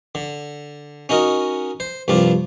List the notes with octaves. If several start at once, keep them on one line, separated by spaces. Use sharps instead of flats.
D3
C#4 D#4 F#4 A#4 D#5
C5
C2 G2 F3 D4 F4